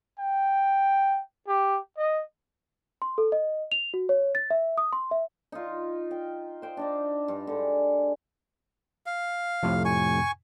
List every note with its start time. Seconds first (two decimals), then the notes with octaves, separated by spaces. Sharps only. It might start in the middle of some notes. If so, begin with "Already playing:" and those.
0.19 G5
1.48 G4
1.98 D#5
3.02 C6
3.18 A4
3.32 D#5
3.72 F7
3.94 F#4
4.09 C#5
4.35 A6
4.50 E5
4.78 D#6
4.93 C6
5.11 E5
5.52 D#4 F4
6.11 G5
6.62 C5 G5
6.77 D4 D#4 D5
7.28 G2
7.47 D3 G#3
9.06 F5
9.63 F2 A2 C3
9.85 G#5 C#6